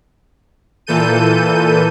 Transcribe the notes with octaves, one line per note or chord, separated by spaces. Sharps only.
A#2 E3 A4 G6 D#7